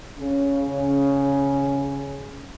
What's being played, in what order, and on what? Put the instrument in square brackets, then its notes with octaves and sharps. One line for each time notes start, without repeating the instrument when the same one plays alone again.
[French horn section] C#3 C#4